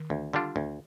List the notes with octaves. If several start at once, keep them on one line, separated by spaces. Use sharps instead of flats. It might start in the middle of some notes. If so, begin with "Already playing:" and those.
Already playing: D#3
D2
D3 G3 D4 F4
D2